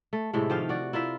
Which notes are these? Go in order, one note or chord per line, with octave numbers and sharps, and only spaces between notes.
A3
A2 C3 G#3 A3
D#3 F3 G4 F5
F#4 D5
E4 F4 A#4 E5